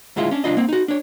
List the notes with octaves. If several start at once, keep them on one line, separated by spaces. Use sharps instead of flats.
D2 A2 G#3 E4 F4
C#4 D4
C2 C3 D4 F4 D#5
A#3 C4
D#4 F#4
D4 C#5